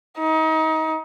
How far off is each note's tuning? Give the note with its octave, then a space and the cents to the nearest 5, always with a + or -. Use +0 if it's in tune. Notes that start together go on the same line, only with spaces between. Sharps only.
D#4 +30